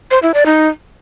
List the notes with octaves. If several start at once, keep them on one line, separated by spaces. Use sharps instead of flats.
C5
E4
D5
D#4